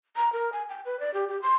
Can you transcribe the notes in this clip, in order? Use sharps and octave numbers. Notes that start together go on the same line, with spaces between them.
A#5
A#4
G#5
G5
B4
D5
G4
G4
C6